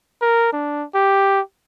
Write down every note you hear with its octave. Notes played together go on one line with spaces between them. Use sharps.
A#4
D4
G4